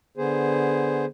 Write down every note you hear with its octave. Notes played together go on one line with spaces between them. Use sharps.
D3 B3 G#4 C5